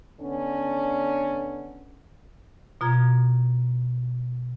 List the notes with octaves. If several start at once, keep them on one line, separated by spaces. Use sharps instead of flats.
D3 B3 C#4 D4
B2 F4 A#5 G#6